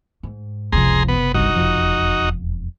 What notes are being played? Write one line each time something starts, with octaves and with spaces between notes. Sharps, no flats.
G#2
F#1 C#2 C3 F3 G#4 A#5 C6
B3
G1 C2 G2 D#4 F#4
E1 F2 F3